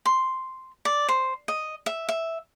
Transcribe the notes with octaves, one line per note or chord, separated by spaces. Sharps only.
C6
D5
C5
D#5
E5
E5